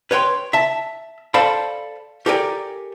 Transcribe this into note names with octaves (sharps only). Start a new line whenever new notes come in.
B4 C#5 G5 C6
E5 A5
A4 C5 D5 F5 A5 B5
G4 A4 A#4 D5 G5 G#5